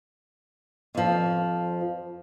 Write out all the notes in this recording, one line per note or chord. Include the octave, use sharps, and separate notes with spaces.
F2 F3